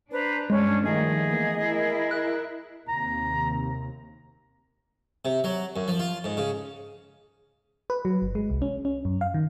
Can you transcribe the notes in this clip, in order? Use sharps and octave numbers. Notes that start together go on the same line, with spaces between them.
D4 B4 C5 A#5
G2 G#3 C#4 D4
D#3 F3 G3 A3 G#4 D#5
E3 A#3 B3
E4 A#4
F#6
D#2 C3 A#5
C3
F#3
F#2
F3
F4
G#2
C#3
B4
F#3
G1
G#3
C2
C#4
C#4
F#2
F5
D#3